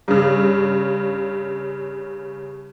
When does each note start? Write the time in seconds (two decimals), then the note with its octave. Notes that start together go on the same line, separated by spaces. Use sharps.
0.08 G2 C#3